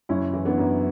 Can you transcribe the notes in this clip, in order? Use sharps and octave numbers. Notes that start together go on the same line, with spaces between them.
F#1 C#4 E4
E3
B3 D4
F#2